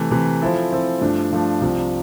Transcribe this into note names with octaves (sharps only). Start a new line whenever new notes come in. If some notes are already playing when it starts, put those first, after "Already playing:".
Already playing: C3 E3 A3
C3 E3 A3
F3 C4 E4 A4
F3 C4 E4 A4
G2 F3 A3 D4
G2 F3 A3 D4
C2 C3 F3